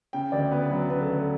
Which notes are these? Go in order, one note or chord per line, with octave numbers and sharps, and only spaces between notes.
C#3 G5
D2 D5
B3 B4
F#3 B4
C#3 B4
A4
D2 B4